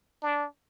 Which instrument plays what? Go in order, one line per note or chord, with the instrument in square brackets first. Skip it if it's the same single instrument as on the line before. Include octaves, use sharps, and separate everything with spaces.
[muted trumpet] D4